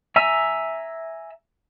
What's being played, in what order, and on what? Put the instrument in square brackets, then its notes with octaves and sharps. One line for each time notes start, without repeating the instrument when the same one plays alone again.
[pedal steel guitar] E5 G#5 A#5 E6